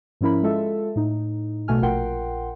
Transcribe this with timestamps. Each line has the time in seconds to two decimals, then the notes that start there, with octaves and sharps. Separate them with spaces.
0.21 G#2 F3 C#4 E4 A#4 B5
0.43 G#3 F4 A4 E5
0.96 A2 D#4
1.68 B1 B2 A3 F#4 G#5 F6
1.82 A#1 F4 A#4 F#5 G5 C6